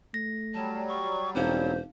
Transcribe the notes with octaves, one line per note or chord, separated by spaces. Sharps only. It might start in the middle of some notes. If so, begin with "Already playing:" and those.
A3 A#6
F#3 G3 A5
C#6
E1 C4 D#4 C5 F5